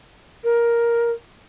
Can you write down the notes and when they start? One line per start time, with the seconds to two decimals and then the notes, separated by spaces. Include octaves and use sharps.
0.44 A#4